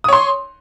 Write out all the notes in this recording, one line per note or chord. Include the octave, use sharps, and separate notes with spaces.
C#5 C6 D#6